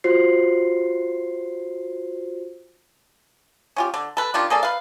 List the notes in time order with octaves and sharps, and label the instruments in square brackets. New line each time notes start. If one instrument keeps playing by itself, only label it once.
[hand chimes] F4 F#4 C5 C7
[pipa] C#4 F4 G4
D3
A4 B4
D#3 D4 F4 G4
A#3 G#4 A4 D5
B4 F5